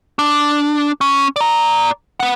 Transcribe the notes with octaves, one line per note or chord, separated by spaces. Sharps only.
D4
C#4
D5 A#5
B4 F#5